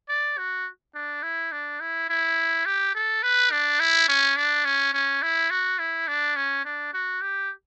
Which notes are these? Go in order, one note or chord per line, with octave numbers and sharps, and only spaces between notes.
D5
F#4
D4
E4
D4
E4
E4
G4
A4
B4
D4
E4
C#4
D4
C#4
C#4
E4
F#4
E4
D4
C#4
D4
F#4
G4